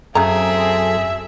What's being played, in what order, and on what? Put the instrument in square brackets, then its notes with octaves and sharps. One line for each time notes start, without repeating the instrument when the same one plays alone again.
[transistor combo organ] F#2 A4 [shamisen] C#3 A3 A#5 [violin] C4 G#4 [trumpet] E5